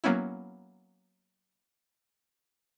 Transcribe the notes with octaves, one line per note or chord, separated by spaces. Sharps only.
F#3 A#3 B3 C#4 E4